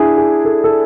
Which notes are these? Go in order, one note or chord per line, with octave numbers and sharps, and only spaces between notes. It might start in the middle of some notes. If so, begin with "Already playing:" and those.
Already playing: D4 E4 G#4
G#4
A4
A4